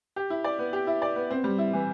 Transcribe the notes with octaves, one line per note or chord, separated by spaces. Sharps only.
G4
E4
D5
B3
G4
E4
D5
B3
C4
G3
E4
E3